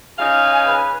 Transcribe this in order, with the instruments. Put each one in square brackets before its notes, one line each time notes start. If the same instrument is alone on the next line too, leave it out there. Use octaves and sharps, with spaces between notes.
[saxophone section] C#3 D#4 F5 [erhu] G#5
[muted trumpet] B4